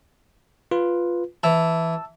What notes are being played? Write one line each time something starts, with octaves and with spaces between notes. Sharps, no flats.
F4 B4
E3 A5 E6